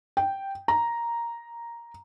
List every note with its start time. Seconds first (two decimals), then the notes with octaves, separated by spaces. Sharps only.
0.17 G5
0.68 A#5